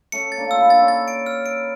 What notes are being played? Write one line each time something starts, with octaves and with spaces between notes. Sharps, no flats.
A3 C#4 C#7
A6
A#3 D4
F4 E6
E4
D4 A6
C#4 E4
A6
D7
F6
D7